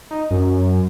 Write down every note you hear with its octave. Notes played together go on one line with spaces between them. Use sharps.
D#4
F#2